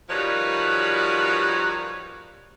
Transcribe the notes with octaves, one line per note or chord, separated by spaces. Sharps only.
D#3 F3 G3 F#4 B4 C#5